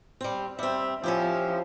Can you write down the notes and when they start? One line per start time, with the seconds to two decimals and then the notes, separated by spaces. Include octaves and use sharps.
0.21 G3 C4
0.59 G3 C4 E5
1.04 F3 C#4 E4 G4